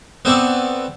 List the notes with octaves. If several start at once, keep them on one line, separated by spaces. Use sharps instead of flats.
B3 C4 A4 D5 C#6